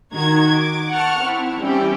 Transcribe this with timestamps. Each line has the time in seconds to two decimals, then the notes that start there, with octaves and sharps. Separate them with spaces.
0.11 D#3 F#4 A#5 G#6
0.53 D6
0.91 F#5 A5 C#6 F6
1.22 C4 E4
1.59 E3 G3 C4 C#4 E4 G4